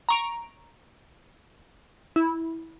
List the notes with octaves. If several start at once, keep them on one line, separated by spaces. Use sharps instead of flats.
A#5 C#6 D7
E4